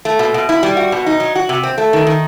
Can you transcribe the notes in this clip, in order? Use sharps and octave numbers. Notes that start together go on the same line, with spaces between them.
A3
B2
B2
E4
G3
F#4
B2
D#4
F#3
F#4
C3
C4
A3
D#3
D#3